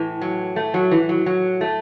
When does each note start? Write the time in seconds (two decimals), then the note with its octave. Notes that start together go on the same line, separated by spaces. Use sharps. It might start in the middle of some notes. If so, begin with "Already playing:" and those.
Already playing: A2 E3
0.22 F#3
0.56 A3
0.74 F#3
0.91 E3
1.09 F#3
1.26 F#3
1.61 A3